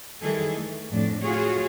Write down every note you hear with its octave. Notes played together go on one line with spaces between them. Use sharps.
D#3 E3 G3 G#4 A4
A3
F2 A2 D4
F4 F#4 G#4 C#5